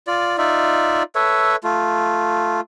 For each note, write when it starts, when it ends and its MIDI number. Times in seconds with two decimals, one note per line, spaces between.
0.07 0.38 65
0.07 0.38 74
0.38 1.03 63
0.38 1.03 65
0.38 1.03 74
0.38 1.03 76
1.15 1.56 69
1.15 1.56 71
1.15 1.56 73
1.15 1.56 76
1.64 2.61 57
1.64 2.61 65